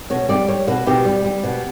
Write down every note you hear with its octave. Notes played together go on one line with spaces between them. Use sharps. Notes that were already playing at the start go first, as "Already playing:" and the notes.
B2 C#5
G3 D5
G3 C#5
B2 B4
B2 G4
G3
G3
B2